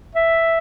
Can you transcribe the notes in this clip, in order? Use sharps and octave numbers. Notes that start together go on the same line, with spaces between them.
E5